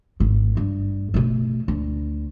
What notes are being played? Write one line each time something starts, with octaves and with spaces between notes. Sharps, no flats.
G#1 A2
G2
B2 A3
D2